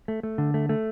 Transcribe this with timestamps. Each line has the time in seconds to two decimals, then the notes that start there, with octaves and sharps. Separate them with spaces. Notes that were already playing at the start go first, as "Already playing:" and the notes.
0.08 A3
0.23 A3
0.38 D3
0.54 A3
0.69 A3